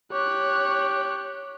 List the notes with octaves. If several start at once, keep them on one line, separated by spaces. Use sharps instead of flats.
G4 C#5 F#6